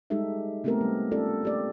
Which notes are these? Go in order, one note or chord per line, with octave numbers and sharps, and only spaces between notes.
G3 G#3 D#4 G4 A4 E5
A3 B3 C4 G4 A4 A#4
G3
C#4 F4 A4 D5
A#3 G4 D5